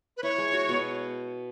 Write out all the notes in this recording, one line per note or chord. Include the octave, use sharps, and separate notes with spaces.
B4
E4 C#5
G#3
F#4
B2